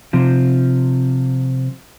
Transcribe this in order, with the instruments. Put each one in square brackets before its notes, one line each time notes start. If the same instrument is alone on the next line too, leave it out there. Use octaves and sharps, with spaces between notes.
[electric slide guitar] C3 F3